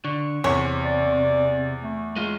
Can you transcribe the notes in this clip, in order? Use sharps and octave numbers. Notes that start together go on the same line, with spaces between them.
D3 C#6
E2 C3 C#5
D5
A3
G#3 F4